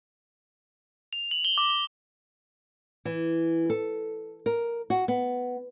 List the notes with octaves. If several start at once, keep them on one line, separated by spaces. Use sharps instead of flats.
F7
F#7
G7
D6
G7
E3
A4
A#4
F#4
B3